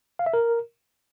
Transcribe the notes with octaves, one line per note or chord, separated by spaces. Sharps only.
F5
E5
A#4